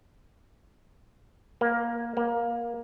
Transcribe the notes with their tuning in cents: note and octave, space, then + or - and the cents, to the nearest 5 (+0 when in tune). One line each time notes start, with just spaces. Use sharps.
A#3 +10
A#3 +15